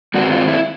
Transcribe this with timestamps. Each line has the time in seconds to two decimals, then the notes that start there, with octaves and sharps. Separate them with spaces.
0.14 G2 D#3 G#3 C4 F#4
0.32 F4
0.48 E4